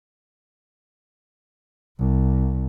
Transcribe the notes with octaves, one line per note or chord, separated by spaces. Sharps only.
C2